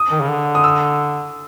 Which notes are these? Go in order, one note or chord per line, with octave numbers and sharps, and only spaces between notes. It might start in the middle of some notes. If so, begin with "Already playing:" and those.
Already playing: D#6
D#3
C#3
D3
D#6
E6